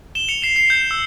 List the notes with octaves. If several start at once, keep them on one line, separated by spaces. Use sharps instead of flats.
E7 G7
C#7 F7
C7 E7
C7
G6
E6